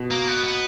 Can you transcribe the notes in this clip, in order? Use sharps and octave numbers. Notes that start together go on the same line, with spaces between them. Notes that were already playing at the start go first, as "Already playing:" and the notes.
Already playing: B2
A#3
B3
B3